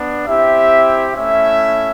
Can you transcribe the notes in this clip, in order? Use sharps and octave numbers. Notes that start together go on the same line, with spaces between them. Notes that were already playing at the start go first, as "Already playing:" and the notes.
Already playing: B3 D4
C4 E4 G4 E5
A3 C#4 E4 E5